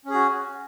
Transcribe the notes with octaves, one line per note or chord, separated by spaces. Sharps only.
C#4 F#4 G#4